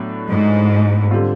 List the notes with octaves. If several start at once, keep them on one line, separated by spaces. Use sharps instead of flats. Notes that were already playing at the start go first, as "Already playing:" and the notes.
Already playing: A2 F#3 B3 D4
G#2
D3 G3 C4 F4